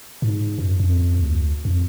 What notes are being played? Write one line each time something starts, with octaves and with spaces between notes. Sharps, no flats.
G#2
F#2
F2
D2
F2